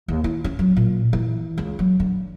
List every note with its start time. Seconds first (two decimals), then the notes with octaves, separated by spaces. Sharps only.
0.08 D#2
0.24 E4
0.44 C#4
0.59 F#3
0.76 A#2
1.13 E3
1.58 C#2
1.79 F#3
2.00 D3